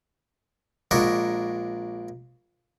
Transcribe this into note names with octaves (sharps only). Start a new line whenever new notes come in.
A#1 G#3 D4 A#4 F#5 C#6